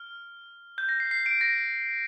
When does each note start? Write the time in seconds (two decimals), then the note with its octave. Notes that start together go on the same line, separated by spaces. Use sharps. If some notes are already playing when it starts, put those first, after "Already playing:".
Already playing: F6
0.78 G6
0.89 A#6
1.00 C7
1.11 C7
1.26 D7
1.41 A#6